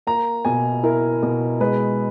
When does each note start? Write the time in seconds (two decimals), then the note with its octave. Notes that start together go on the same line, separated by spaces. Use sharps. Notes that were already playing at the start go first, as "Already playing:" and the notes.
0.07 A#3 A#5
0.45 B2 G#5
0.83 E4 A#4
1.23 B2
1.60 G#3 B4